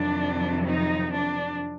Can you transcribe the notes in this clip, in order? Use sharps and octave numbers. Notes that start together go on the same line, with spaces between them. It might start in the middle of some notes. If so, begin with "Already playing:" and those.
Already playing: F2 C3 D#3 F#3 D4
D#4
D4